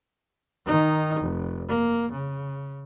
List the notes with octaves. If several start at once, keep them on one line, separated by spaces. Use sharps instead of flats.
D#3 D#4
F1
A#3
C#3